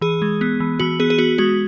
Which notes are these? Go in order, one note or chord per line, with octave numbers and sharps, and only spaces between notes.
E3 G#4
G#3
B3
E3
E3 F#4
B3 G#4
G#4
B3 F#4
G#3 F#4